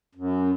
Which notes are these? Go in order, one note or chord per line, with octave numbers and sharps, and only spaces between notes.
F#2